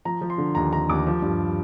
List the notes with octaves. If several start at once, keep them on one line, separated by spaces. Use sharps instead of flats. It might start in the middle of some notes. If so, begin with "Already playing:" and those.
F3 A#5
F3
C6
D3
D#2 A#5
D3 A#5
D#2 D6
F3
G2